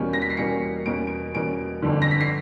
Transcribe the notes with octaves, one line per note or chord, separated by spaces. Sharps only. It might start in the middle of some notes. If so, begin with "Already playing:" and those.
Already playing: E2 B2 G3 A#3 C#4
A#6
B6
C7
E2 B2 G3 A#3 C#4 C#7
E2 B2 G3 A#3 C#4 D7
D7
E2 B2 G3 A#3 C#4 D7
G1 F2 D3
A#6
B6
C7